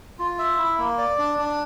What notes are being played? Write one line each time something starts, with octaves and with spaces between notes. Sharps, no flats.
F4
E5
E4
A#3
D5
D4
D4